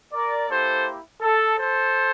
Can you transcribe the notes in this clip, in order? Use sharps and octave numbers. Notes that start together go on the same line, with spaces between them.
A#4 D5
A#3 E4 G4 A4 C5
A4
A4 C5